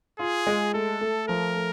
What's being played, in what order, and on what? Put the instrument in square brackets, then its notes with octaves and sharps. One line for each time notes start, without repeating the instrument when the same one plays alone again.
[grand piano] F4 [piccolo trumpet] G#4
[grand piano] G#3
[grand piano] A3 [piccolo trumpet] A4
[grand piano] A3
[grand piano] F3 [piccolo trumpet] A#4
[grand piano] A3